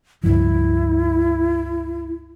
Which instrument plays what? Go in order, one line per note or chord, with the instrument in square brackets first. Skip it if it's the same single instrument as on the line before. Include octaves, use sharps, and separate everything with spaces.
[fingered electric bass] C#2 G2 F3 [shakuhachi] E4